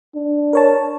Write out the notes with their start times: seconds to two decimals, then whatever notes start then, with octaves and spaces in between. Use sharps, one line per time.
0.15 D4
0.53 A#4 C#5 A5